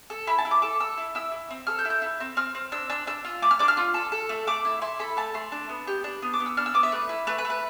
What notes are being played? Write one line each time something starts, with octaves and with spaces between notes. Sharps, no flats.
A4
E4 B5
A5
E4
D6
A4 D6
A4 E6
E4
E4 E6
E4
C4
A4 F6
G6
E4
G6
E4
C4
C4 F6
C4
D4 E6
D4 E6
D4 E6
F4
A3 D6
F6
D4 D6
F6
F4
A4
A4
A3
A3 D6
E4
E4 C6
A4 B5
A3 A5
A3 C6
D4
B3
G4
D4
B3
D6
B3
E6
D4 F6
E6
B3 D6
E5
A3 B4
E4
A3 B4
B4
A3
B4